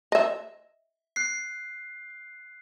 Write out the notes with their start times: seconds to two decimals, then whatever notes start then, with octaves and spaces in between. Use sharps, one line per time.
0.12 D#5 E5
1.16 F#6 C7